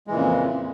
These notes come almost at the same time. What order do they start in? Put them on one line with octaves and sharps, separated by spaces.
G#3 E3 A#2 C#3 F2